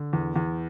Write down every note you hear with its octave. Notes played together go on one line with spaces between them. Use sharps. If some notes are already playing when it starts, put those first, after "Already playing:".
Already playing: D3
E2
E2